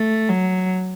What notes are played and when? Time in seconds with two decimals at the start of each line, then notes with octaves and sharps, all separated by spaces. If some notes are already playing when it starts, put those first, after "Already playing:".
Already playing: A3
0.28 F#3